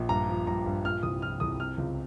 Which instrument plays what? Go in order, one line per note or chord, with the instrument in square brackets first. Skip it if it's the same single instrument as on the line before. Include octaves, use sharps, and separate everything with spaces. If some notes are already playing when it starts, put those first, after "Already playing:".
Already playing: [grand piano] A#1
G2 A#5
F3
G2 A#5
G2
A#2 F6
C2 D#6
F3 F6
C2 D#6
C3 F6
C#2